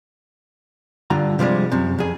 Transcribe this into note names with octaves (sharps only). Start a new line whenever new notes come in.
G2 D3 F4 A#5
C3 F3 G3 G#3
F#2 C3
F2 G#4